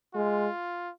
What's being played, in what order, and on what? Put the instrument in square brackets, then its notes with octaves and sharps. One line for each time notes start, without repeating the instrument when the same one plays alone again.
[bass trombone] G#3 [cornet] F4